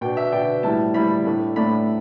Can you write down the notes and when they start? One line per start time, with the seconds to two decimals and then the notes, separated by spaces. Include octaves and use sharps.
0.01 B2 B3 D4 G5
0.17 E5
0.32 B2 B3 D4 G5
0.63 A2 G3 E4 A5
0.94 A2 G3 E4 B5
1.25 A2 A3 D4
1.56 A2 A3 D4 B5